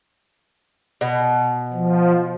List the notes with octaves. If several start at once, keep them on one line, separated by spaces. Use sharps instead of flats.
B2
F3